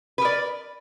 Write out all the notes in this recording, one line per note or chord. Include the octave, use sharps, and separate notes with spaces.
A#4 B4 D5